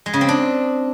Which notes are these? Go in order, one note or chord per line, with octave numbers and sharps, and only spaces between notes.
G#3
C#3
C4
D4